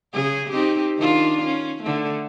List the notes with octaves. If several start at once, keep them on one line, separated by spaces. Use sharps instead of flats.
C#3 G#4
C4 D#4 G4
D#3 D4 F4
C#4
D3 A3